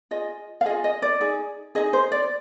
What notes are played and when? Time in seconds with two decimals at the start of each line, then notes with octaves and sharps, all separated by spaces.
0.11 F4 G#4 D#5
0.61 F5
0.65 G#4 D#5
0.69 F4
0.84 D#5
1.02 D5
1.21 D#4 G#4
1.75 D#4 G#4 D#5
1.93 C5
2.12 D5